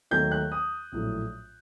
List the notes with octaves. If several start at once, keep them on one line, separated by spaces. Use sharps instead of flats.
D#2 D#3 F#3 A3 G6
F#6
D#6
A#1 A2 F#3 A3